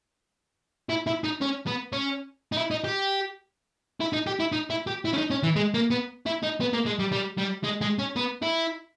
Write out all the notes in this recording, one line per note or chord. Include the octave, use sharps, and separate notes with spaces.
E4
E4
D#4
C#4
B3
C#4
D#4
E4
D#4
G4
E4
D#4
G4
E4
D#4
E4
G4
E4
C#4
D#4
C#4
E3
G#3
A#3
B3
E4
D#4
B3
A#3
G#3
G3
G3
G3
G#3
G#3
C#4
B3
E4